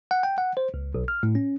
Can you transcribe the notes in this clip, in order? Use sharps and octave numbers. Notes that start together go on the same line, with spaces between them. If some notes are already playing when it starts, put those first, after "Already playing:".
F#5
G5
F#5
C5
C#2
B1
F6
A2
C#4